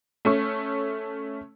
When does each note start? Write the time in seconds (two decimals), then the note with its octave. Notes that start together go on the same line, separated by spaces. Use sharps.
0.25 A3 C#4 C#6